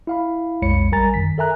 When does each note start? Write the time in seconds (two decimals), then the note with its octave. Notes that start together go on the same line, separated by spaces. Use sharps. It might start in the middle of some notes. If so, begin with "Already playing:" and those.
0.07 E4 F5 B5
0.62 B1 F2 G#3 C#5 B5 C#7
0.92 A1 G3 A#4 G#5 A#5 A6
1.14 F#2 D#3 B6
1.38 A4 A#4 E5 G#5 A#5 F#6